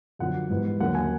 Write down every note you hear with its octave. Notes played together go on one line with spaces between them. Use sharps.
F#2 D3 F3 F#5
G#2 E3 G3 B3
D#2 D3 F#3 A#3 C#4 F#5
G#5